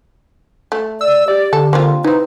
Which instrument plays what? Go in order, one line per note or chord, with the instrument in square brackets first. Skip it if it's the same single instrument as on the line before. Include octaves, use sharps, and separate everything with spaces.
[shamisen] A3
[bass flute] D5 [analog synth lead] E6
[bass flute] G4 [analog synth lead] D5
[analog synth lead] D3 [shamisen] A4
[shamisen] A#3 C4 F4
[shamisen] C4 E4 [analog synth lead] D#4 [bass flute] B4